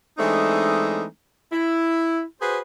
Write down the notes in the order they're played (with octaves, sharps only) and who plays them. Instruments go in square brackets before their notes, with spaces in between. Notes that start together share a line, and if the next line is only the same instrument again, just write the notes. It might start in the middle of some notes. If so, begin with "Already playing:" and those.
[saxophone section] E3 G#3 A3 C4 D4 D#4
E4
F#4 G#4 B4 C5